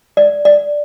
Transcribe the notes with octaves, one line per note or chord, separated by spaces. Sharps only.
D5
D5